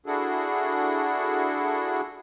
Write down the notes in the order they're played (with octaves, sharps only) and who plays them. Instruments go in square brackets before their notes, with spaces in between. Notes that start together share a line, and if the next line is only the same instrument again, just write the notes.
[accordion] D4 E4 F#4 G#4 A4